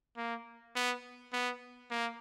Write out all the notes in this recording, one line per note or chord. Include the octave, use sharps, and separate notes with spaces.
A#3
B3
B3
A#3